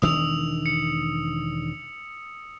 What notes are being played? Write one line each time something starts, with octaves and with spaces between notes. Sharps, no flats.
E1 D#3 D4 D#6 E6 F7
C#7